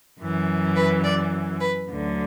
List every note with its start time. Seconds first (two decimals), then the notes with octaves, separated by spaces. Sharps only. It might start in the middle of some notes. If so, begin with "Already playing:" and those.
0.19 F#2 E3
0.76 B4
1.03 D5
1.60 B4
1.89 D2 D3 F#3